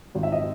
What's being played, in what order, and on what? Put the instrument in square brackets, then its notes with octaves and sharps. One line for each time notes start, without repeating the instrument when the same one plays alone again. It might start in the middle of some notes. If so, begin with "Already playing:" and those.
[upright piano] G#1
E5
D#5